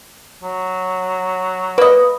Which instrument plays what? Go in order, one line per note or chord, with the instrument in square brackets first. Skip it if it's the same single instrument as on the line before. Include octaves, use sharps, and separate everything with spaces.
[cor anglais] F#3
[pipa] A#3 D#5 [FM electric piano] B4